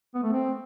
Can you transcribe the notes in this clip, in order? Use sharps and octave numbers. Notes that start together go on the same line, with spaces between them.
B3
A3
C4